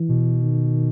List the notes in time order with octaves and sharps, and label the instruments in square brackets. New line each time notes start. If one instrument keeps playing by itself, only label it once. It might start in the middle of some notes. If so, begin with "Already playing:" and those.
Already playing: [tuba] E3
[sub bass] B2
[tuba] D#3